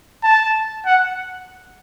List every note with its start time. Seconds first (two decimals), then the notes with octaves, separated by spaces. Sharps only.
0.24 A5
0.86 F#5